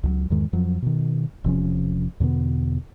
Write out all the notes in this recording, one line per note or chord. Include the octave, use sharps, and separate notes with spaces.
C#2 F3 F#3
E2 G#2 D#3 G#3
F2 F3 F#3
B2 D#3
E1 C3 F3 C#4
E2 B2 D3 B3